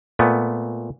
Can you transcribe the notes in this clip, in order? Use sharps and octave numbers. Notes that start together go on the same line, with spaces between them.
A#2 A3 B3